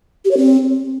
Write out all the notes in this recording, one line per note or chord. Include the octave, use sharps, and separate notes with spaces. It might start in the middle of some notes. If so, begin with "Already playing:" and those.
G4
C#5
C4